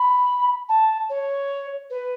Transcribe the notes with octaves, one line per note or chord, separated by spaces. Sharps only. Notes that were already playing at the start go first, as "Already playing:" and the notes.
Already playing: B5
A5
C#5
B4